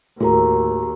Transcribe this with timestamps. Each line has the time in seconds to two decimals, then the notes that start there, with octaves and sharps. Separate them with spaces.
0.20 D#2 A2 F#4 G#4 A#4 A#5